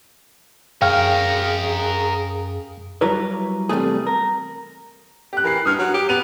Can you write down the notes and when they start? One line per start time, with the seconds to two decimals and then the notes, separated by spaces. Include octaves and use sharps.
0.82 F#2 G#4 A#4 C#5 F5 G5 F6
3.01 F#3 G3 E4 A#4 B4 C#5
3.69 E2 C3 F3 G3 A3 G#4
4.07 A#4
5.33 G4 F#6
5.44 E3 A#4 C7
5.65 G2 D#6 F6
5.79 F#3
5.94 G4
6.09 B3 D#7 F7